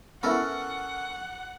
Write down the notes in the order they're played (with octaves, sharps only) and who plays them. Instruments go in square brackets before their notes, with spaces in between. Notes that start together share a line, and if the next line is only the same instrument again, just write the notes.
[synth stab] B3 E4 [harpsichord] C#4 A4 A#4 [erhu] F#5